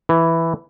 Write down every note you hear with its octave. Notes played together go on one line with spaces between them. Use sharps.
E3